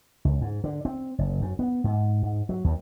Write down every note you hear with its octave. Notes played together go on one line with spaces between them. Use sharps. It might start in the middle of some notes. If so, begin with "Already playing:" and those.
C#2
G#2
D3
C4
F#1
F#2
B3
G#2
G#2
F#3
D#2